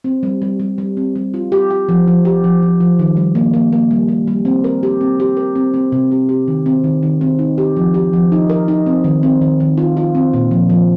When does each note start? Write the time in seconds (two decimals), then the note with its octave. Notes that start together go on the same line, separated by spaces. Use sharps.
0.04 C4
0.23 G3
0.42 G3
0.59 G3
0.78 G3
0.97 C4
1.16 G3
1.34 F4
1.52 G4
1.71 G4
1.89 F3
2.08 F3
2.25 G4
2.44 F3
2.62 F3
2.81 F3
2.99 D#3
3.17 G3
3.35 A#3
3.54 A#3
3.73 A#3
3.91 G3
4.08 G3
4.27 G3
4.45 C4
4.64 A#4
4.83 G4
5.01 C4
5.20 G4
5.37 A#4
5.55 C4
5.74 C4
5.92 C3
6.11 G4
6.29 G4
6.48 D#3
6.66 C4
6.84 D#3
7.03 D#3
7.21 C4
7.39 D#4
7.58 G4
7.76 F3
7.94 G4
8.13 F3
8.32 D#4
8.50 A#4
8.68 D#4
8.86 C4
9.04 D#3
9.23 C4
9.41 D#3
9.60 D#3
9.78 F4
9.97 F4
10.15 C4
10.33 A#2
10.51 F3
10.69 F3